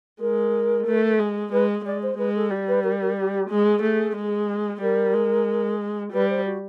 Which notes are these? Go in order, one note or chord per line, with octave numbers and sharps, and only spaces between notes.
G#3 A#4
A3
G#3
G#3 B4
G#3 D5
C5
G#3 B4
A4
G3
B4
A#4
A#4
G4
G4
G#3 G#4
A3
G#3
G3 A#4
G#3
G3 B4
C5
F#4